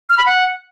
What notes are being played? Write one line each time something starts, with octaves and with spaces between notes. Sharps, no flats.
F6
B5
F#5